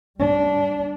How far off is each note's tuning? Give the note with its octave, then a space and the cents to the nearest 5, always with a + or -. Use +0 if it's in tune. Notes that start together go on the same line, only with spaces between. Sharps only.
G3 +0 D4 -20